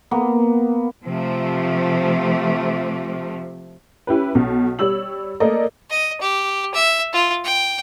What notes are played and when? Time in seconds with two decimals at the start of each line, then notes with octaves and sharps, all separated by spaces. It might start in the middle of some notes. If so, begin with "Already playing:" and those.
0.11 A#3 B3
1.04 C3 F3 A3
4.07 C#4 E4 G4 B4
4.35 B1 B2
4.79 G3 C#5 E6 F#7
5.40 A3 A#3 A4 A#4 D5 D#5
5.90 D#5
6.21 G4
6.74 E5
7.13 F4
7.44 G5